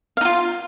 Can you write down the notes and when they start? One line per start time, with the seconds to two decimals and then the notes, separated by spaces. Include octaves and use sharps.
0.17 F5
0.21 D#4
0.25 F4